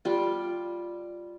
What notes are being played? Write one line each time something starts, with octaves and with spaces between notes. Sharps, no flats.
G3 F4